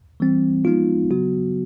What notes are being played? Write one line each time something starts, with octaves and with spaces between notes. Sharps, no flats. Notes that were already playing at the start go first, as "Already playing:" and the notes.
E3 G3 C4
F3 G#3 B3 D#4 F4
C#3 F#3 B3 F#4